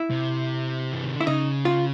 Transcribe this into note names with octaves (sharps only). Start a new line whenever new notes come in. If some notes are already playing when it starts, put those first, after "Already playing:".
Already playing: E4
C3
E3
D#3
D3
E4
C#3 D#4
F4